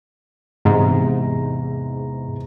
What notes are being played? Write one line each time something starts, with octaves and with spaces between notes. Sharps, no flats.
E2 G#2 C3 A#5